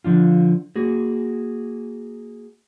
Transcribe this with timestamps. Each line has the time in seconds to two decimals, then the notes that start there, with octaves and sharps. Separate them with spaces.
0.04 D3 F3 D4 F4
0.76 A#3 F#4 G#4